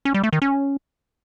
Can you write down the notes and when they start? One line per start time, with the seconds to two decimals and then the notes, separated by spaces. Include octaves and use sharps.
0.05 C#4
0.14 G3
0.24 A3
0.33 D#3
0.42 C#4